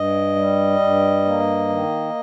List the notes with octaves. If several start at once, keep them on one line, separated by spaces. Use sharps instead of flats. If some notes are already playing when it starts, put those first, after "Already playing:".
Already playing: G2 D#5
G3
G2
A#3
D#3